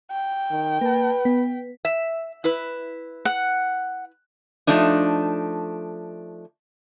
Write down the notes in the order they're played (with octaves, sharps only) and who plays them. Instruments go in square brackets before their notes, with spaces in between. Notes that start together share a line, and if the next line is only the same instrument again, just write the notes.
[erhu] G5
[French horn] D#3
[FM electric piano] A#3 A5 [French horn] B4
[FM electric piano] B3
[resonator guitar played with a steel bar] E5
E4 B4
[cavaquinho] F#5
[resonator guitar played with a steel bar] F3 A3 D4 D#4